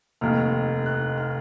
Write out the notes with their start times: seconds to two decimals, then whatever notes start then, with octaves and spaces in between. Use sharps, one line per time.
0.21 F1 D#2 D#3 F6
0.86 F#6
1.18 F6